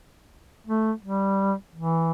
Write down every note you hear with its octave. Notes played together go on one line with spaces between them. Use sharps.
A3
G3
E3